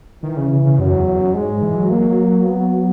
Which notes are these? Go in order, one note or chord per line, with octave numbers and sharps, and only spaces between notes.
D#3 E3
C#3
C#3
C#3
F#2 F#3
E2
E2
F#2
G#2 G#3
G#2
E3
F#3
A#3
B3